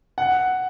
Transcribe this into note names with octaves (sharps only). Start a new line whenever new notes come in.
F#5